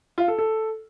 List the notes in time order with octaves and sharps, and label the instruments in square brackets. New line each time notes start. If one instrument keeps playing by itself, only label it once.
[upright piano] F4
A4
A4